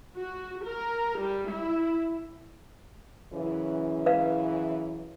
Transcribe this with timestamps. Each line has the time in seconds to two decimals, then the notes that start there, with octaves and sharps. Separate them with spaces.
0.17 F#4
0.65 A#4
1.20 G3
1.50 E4
3.32 F#2 C#3 E3
4.06 B4 F5